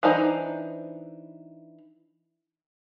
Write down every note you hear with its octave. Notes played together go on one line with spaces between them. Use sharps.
E3 D4 D#4 C5 A#5